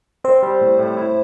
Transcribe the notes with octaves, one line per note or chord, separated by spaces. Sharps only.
C4 C5
G3
A2
A2
E4